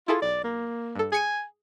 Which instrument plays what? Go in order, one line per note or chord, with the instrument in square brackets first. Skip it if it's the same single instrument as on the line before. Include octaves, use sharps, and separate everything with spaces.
[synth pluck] E4 G#4 A4 [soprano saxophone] F4
[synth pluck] B1 [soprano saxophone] D5
[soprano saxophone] A#3
[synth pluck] G2 A4
[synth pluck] G#4 C#7 D#7 [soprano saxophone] G#5